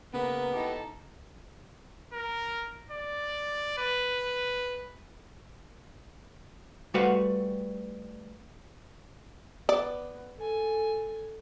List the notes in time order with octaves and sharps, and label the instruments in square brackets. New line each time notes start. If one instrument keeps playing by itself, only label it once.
[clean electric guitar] C#3 A#3 [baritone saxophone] B3 [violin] A#4 B4
[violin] D#4 A4 [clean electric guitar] E4 G4
[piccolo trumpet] A#4
D5
B4
[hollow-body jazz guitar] G3 A3 F#4 B4 F5 F#5
[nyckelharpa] B3 [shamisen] D5
[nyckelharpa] A4 G#5